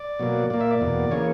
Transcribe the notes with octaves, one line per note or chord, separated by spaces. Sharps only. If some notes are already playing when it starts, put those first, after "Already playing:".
Already playing: D5
B2 F#3 A#3
A#2 A#3 D5
E5
D5
E2 B2 A#3
C#3 E3 A#3 C#5